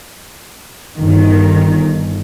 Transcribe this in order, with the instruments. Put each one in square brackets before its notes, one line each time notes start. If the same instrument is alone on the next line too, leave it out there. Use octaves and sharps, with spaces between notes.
[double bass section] G1 [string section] D#3